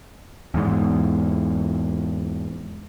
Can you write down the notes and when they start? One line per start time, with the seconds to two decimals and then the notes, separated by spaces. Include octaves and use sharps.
0.54 E2 G#2